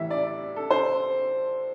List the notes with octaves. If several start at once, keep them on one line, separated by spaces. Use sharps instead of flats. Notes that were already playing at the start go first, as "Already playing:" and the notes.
Already playing: A2 E3 G3 E5
D5
A4
C5